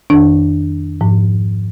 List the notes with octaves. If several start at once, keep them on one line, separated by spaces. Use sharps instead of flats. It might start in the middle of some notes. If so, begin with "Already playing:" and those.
F2 D#3 D4
G#2 F3